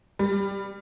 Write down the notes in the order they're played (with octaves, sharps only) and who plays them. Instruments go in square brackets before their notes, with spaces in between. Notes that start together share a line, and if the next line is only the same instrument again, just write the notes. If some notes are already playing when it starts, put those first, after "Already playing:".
[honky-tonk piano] G3